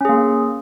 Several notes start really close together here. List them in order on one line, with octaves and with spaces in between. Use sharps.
C#4 G#4 A#3